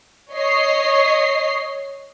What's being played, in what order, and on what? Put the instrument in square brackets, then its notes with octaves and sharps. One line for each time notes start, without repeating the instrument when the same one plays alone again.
[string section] C#5 D#5 C7